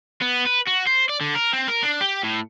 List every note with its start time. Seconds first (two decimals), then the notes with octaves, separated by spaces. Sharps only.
0.22 B3
0.47 B4
0.68 F#4
0.87 C5
1.09 D5
1.21 D3
1.35 A#4
1.53 C4
1.68 A#4
1.83 D4
2.01 G4
2.24 A2